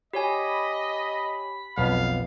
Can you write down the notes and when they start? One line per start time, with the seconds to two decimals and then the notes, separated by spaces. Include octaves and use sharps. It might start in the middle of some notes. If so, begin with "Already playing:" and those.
0.13 G4 C#5 D#5 G#5 B5
1.78 B1 F2 B3 F5